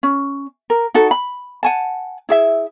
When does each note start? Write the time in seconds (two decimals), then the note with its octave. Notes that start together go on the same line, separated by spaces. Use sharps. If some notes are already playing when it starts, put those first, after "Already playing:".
0.03 C#4
0.70 A#4
0.94 D#4 F#4 A4
1.11 B5
1.63 F#5 G#5 A5
2.29 E4 G#4 E5